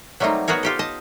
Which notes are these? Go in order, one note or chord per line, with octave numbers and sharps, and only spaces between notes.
F#3 G3 A3 A#3 C4 D#4
B3 F#4 G#4 A#4 C#5
F4 G4 A4
D#5 A5